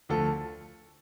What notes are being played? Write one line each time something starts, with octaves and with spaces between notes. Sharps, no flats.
D2 D3 F3 A4